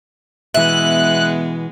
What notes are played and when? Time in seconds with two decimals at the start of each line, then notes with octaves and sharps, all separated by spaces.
0.54 B2 E3 G#3 B3 E5 F#6